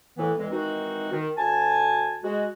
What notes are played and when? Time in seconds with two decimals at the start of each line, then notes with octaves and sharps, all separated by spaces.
0.17 A2 E3 B3
0.38 E2 E3 G#3 C4
0.52 D#3 E3 G#3 C4 D#4 F#4
1.12 D#3
1.37 D2 G#5 A5
2.23 G#3 F#4